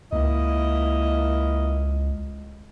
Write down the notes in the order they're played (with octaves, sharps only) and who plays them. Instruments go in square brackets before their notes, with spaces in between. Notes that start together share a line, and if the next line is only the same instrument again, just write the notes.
[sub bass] C#2 [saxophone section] A#3 E4 D#5